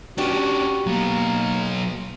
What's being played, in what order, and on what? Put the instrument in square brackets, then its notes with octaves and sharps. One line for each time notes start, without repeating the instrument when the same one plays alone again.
[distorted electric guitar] C#4 D4 [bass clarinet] F#4 [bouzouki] G4 B4
[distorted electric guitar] F#3 B3 [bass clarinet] A#3